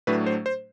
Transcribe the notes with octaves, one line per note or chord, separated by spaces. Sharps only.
A2 F#3 A3 D4 B4
C5
C5